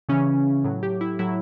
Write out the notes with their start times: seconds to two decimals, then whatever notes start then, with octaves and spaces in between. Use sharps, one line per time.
0.09 C#3 E3 C#4
0.64 A2 F#3
0.83 G4
1.01 E4
1.19 A2 F#3 E4